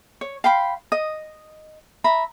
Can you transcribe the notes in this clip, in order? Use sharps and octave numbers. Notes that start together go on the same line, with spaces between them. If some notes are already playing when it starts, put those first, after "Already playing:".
C#5
F5 G5 B5 C6
D#5 D#6
E5 A#5 B5